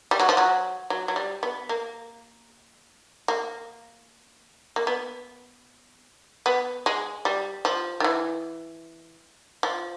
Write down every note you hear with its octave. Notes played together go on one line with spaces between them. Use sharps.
G3
F#3
F3
F#3
F#3
F#3
G3
B3
A#3
A#3
A#3
B3
B3
G#3
G3
F3
D#3
E3
F3